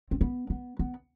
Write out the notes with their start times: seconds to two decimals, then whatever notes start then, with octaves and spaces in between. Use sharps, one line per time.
0.11 C4
0.21 B3
0.50 B3
0.79 B3